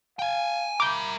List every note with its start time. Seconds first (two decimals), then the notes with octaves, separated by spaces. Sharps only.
0.19 F5 G5 G#5
0.80 A#4 E5 B5 D6 G6